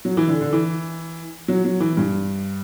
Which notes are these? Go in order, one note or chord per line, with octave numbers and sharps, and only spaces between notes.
F#3
E3
D3
D3
E3
F#3
F#3
E3
G2